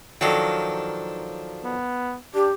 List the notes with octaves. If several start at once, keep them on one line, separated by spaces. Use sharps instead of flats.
D#3 F3 F#3 D4 A4 G5
B3
D4 G4